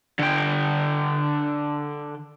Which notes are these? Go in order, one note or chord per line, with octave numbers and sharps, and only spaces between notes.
D3 G5